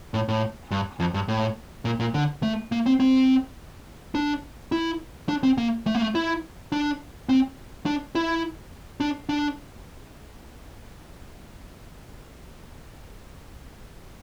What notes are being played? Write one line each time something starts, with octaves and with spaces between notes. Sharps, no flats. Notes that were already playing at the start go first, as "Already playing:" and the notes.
A2
A2
G2
F2
G2
A2
A#2
A#2
D3
A3
A#3
C4
C4
D4
E4
D4
C4
A#3
A3
A#3
A3
E4
D4
C4
D4
E4
D4
D4